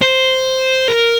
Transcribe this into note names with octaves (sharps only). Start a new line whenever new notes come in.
C5
A#4